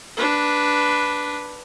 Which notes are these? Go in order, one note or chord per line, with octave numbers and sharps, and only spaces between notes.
D4 B4